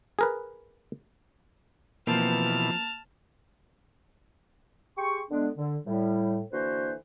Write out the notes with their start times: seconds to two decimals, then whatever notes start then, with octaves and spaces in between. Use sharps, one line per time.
0.19 G#4 A#4 B4
2.07 B2 E3 F3 A#3 C4 A5 F6
4.98 G4 G#4 G5 C6 C#6
5.31 D3 G#3 B3 D4
5.57 D3
5.87 A2 G3
6.52 D3 E3 A#3 F#4 B4 C5